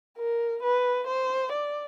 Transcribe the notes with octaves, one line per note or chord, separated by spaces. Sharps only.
A#4
B4
C5
D5